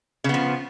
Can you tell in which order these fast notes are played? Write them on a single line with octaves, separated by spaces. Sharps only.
C#3 B3 F3